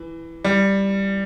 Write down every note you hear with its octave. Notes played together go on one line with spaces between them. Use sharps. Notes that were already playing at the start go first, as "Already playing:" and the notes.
Already playing: E3
G3